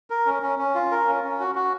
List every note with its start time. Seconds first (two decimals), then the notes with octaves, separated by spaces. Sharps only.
0.10 A#4
0.26 C#4
0.43 C#4
0.59 C#4
0.75 F4
0.91 A#4
1.07 C#4
1.24 C#4
1.40 F#4
1.55 F#4